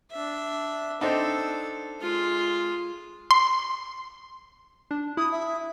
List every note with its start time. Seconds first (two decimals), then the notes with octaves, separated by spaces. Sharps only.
0.12 D4 E5
1.01 C4 D4 D#4 A4
2.00 G#3 F4
3.31 C6
4.91 D4
5.17 E4 D#6
5.31 E5